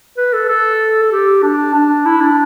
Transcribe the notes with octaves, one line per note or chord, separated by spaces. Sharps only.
B4
A4
A4
A4
G4
D4
D4
E4
D4